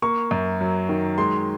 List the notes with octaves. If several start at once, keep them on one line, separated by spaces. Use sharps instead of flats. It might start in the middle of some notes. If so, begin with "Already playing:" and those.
A#3 C#6
F#2
F#3
D#3
G#3 C6